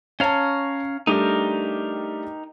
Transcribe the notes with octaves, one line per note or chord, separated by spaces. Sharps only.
C#4 C#5 F5 A5 A#5
G3 A3 D4 D#4 G4 A#4